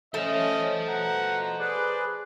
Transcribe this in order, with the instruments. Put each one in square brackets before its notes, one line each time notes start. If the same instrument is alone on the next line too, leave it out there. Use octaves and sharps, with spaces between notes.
[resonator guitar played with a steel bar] A3 [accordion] C#4 [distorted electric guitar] C5 A5 [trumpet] D#5
[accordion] B2 A#5 [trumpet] F#5
[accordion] G#4 B4 [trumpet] D5